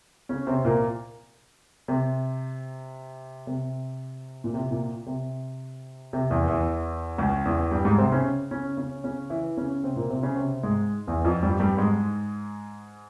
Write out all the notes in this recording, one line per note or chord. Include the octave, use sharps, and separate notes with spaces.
C#3 C#4
C3 C4
A#2 A#3
C3
C3
A#2
C3
A#2
C3
C3
E2 E3
E2 E3
C#2 C#3
E2 E3
G2 G3
G#2 G#3
C3 C4
C#3 C#4
C#3 C#4
C#3 C#4
C#3 C#4
E3 E4
C#3 C#4
C3 C4
A#2 A#3
C3 C4
C#3 C#4
C3 C4
G#2 G#3
E2 E3
F2 F3
G2 G3
G2 G3
G#2 G#3